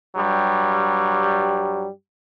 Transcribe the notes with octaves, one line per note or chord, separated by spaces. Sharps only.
G2 F#3 G3